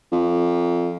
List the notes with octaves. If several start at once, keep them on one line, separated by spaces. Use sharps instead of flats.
F2